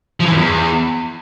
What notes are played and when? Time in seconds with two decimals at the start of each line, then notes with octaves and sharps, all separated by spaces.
0.20 F3
0.26 E3
0.31 F#2
0.37 E2